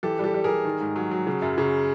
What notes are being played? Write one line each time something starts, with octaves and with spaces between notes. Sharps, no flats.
E3 G4 A4
G3 G4 A4
G3
G#4 A#4
G3
D#3
G#2
F#3
F#3
C#3
F#2
C#3